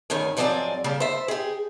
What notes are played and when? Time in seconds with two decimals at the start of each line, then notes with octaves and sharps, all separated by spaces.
0.10 D2 G2 D#3 C#4 G#5
0.37 G#2 F3 F#3 C4 D5 G#5
0.84 C#3 G3 A#3 D4 G4
1.00 C5 E5
1.28 G4 G#4